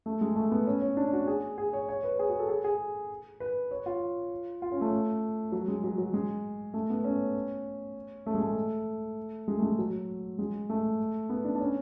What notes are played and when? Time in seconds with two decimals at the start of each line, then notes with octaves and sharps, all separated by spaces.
0.06 A3
0.21 G#3
0.36 A3
0.51 B3
0.67 C#4
0.82 C#4
0.97 D4
1.13 F#4
1.27 G#4
1.58 G#4
1.73 C#5
1.89 C#5
2.04 B4
2.19 G#4
2.29 F#4
2.39 A4
2.49 G#4
2.64 G#4
3.40 B4
3.71 C#5
3.86 F4
4.62 F4
4.72 C#4
4.81 A3
5.52 F#3
5.68 G#3
5.84 F#3
5.98 F#3
6.14 G#3
6.74 A3
6.90 B3
7.04 C#4
8.26 A3
8.34 G#3
8.42 A3
9.48 G#3
9.59 A3
9.62 G#3
9.79 F#3
10.39 G#3
10.70 A3
11.30 B3
11.44 D4
11.55 D4
11.60 C#4